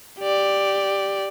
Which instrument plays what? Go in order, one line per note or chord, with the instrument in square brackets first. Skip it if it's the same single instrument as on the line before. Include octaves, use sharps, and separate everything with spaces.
[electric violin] G4 D5